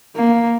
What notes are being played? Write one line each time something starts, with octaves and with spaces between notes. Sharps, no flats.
A#3